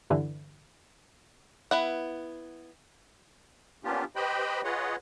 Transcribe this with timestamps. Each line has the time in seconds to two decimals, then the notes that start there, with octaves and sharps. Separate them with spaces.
0.10 G2 D3 E3
1.71 B3 E4 F#5
3.84 A#3 B3 C#4 D4 F4 G4
4.16 G4 B4 C5 D#5 G5 B5
4.64 F4 G#4 B4 C#5 D#5 F#5